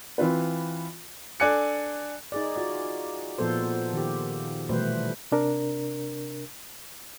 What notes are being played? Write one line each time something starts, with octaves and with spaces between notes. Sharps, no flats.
E3 C4 F4 B4
D4 A4 D5 G#5 F#6 C#7
D#4 G#4 D5
F4 F#4 D5
A#2 F3 B3 A4 C5
D#3 F4 G4
B2 E3 G3 A3 B4 C5
C3 D4 A#4